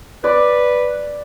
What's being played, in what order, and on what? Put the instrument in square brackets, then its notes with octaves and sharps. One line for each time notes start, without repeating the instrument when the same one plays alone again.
[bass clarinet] B4 [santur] D5